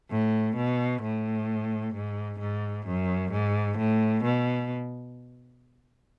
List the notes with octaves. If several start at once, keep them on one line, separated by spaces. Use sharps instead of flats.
A2
B2
A2
G#2
G#2
F#2
G#2
A2
B2